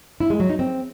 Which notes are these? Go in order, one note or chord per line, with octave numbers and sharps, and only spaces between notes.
E4
G#3
F#3
D#4
C4